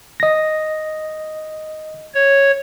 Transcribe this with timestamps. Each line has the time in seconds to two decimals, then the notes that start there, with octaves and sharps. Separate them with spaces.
0.20 D#5 A#6
2.14 C#5